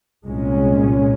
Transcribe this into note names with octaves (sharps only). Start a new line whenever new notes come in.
C2 A#2 G#3 C#4